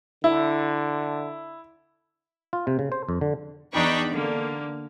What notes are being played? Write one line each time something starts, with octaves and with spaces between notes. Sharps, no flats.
D3 E4
F4
C3
C#3
C5
F2
D3
E2 D4 D#4 G5 B5 C#6
D3 A#3